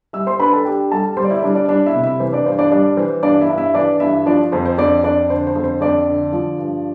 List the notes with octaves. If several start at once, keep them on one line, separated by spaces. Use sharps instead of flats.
G3 E5 E6
C5 C6
D4 B4 B5
A4 A5
D4 G4 G5
G3 A4 A5
G3 C5 C6
D5
E4 E5
G3 D4 D5
D4 D5
G3 D4 D5
E4 E5
C3
E4 E5
E3 C5
D4 D5
G2 C5
D4 D5
G3 D4 D5
E3 C5
G2 D4 D5
E4 E5
G2
E4 E5
E3 D4 D5
G2 E4 E5
F3 D4 D5
F2 C5
C5
F2 D4 D5
F2 D4 D5
D3 C5
C5
F2
C5
F2 D4 D5
D3
F3
G2